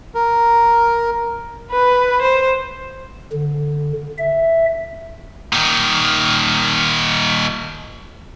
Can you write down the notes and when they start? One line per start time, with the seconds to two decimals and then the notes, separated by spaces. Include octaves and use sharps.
0.15 A#4
1.71 B4
2.21 C5
3.33 D3
4.19 E5
5.53 A#2 D#3